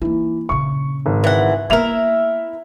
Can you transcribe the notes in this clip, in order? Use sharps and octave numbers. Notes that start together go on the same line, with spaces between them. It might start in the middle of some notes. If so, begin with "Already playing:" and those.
E3 A#3 D#4
A#1 C#3 C#6
G#1
E3 F#5
A#3 B3 E4 A#4 E5 F7